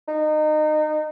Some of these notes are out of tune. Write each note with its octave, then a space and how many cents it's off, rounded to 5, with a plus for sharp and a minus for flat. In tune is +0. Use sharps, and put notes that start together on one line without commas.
D#4 -25